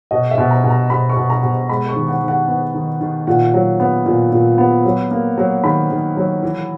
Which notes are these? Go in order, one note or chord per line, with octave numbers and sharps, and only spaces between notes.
B2 D#5
E5
B2
A#5
B2
A#5
B2 B5
C#6
B2
A#5
B2
G#3 B5
C#6
D#3
F#5
D#3
F#5
B3
D#3
D#3
A#2 F#5
F#3
B3
A#2
A#2
B3
F#3
A#3
F#3
D#3 B5
D#3
F#3
E3